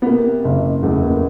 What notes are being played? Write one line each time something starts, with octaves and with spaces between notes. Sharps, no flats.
B3
C3 A#3
F#1
E2 A3
A#3